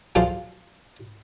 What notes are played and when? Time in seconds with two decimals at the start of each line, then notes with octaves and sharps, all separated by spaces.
0.15 F#3 G#3 F4 A4 C5